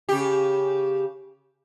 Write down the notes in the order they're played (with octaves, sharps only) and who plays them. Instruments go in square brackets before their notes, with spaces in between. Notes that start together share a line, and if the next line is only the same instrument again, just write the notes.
[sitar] C#3 G4